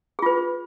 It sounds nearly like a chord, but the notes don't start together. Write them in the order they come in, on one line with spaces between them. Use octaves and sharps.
G#4 F4 B4